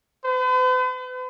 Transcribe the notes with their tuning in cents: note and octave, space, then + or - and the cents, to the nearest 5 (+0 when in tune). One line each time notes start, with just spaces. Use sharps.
B4 +45